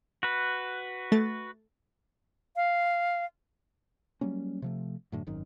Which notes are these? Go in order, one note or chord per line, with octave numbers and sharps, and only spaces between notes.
F#4 B4
A3 A6
F5
F#3 G3 A#3 C#4
C3 F3 A3
F#2 A2 D3
G#1 F#2 D#3